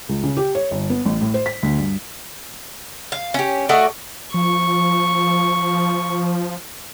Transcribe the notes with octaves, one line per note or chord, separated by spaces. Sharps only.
C#2
C#3
G4
C#5
G1
B3
A1
A2
C5
B6
D2
G2
F5
C#4 G4
A3 F#4 D5 D#5
F3 C#6